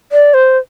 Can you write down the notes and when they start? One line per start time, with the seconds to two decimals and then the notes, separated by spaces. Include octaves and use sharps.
0.12 D5
0.34 C5